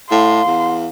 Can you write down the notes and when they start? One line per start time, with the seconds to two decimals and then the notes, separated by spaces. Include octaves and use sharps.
0.11 A2 F5 C6
0.46 E2